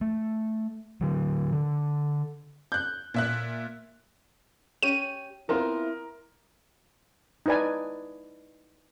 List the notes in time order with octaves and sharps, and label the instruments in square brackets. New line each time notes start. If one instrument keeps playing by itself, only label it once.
[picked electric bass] A3
D3 F#3
D3
[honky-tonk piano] F#6 G6
A#2 E5 F#6
[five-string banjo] C#4 G4 [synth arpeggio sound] D#7
[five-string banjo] B3 C4 F4 [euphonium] E4 [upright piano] A#4
[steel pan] D#4 E4 B4 D5 G#5